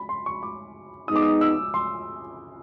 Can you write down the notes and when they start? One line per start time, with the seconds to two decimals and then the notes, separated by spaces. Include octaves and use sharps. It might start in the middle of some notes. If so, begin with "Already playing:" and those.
Already playing: B5
0.09 C6
0.26 C#6
0.43 D6
1.08 G#3 B3 D#4 D#6
1.16 D6
1.23 D#6
1.41 E6
1.74 C6